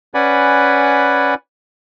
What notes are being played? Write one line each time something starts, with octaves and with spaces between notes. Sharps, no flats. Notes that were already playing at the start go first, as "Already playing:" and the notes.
C#4 B4 D5 F#5 G#5 B5